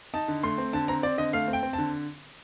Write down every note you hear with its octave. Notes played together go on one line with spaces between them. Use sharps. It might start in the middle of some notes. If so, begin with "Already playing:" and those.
D#4 A5
D3
A3 C6
C4
D3 A5
C4 A#5
C4 D5
D3 D#5
A3 F5
C4
G5
C4
A5
D3